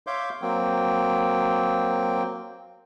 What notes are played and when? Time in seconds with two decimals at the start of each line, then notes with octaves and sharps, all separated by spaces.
0.07 C#5 E5 F5 C6 D6 G6
0.42 F#3 A#3 C4 G5